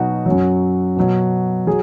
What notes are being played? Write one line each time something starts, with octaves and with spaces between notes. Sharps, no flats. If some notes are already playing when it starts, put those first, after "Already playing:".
Already playing: B2 F#3 D#4 F#4
F#2 F#3
B2 F#3
F#3 G#4